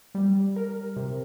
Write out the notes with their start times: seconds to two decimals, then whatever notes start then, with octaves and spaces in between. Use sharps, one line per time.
0.15 G3
0.56 A#4
0.96 C3